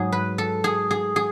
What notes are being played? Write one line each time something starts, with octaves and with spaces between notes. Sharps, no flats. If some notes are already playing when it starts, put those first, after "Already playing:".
Already playing: G#2 F#3 G#4
B4
A4
G#4
G#4
G#4